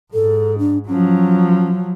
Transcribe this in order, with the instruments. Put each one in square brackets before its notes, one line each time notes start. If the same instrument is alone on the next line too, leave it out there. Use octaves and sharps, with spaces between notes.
[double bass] G#2 [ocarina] A4
[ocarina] D4
[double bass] F3 F#3 [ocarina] C#4